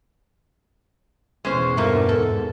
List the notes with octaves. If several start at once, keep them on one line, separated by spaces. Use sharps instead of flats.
E2 B2 G#3 C#4 C5
G2 A3 A#3 F4 A#4
G#2 A4